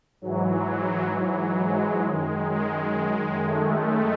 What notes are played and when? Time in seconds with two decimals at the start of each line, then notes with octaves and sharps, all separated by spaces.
0.21 G#2 E3 F#3
1.14 F#3
1.60 G#3
2.06 F#2 D#3
2.52 G#3
3.45 A3